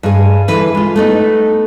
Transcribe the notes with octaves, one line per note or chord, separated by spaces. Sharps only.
G2 G#4
D3 E3 B4
G#3 F4
A3 B3 D#4